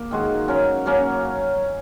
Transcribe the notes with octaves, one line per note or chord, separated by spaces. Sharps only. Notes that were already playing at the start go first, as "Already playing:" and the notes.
Already playing: A#3
D#3 G#3 F#4
F#3 C#4 A#4
F#3 A#3 C#4 A#4